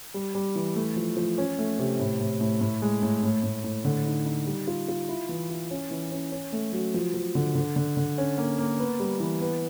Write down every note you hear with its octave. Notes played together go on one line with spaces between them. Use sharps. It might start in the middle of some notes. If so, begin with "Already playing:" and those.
G3
G3
E3
A3
F3
F3
C#4
A3
C3
A2
A2
A2
A2
G#3
A2
A2
A2
A2
D3
D#4
D#4
G3
F4
F4
E4
E3
E4
C#4
E3
C#4
C#4
A3
F#3
F3
F3
D3
D3
D3
D3
C#4
A#3
A#3
B3
G3
E3
B3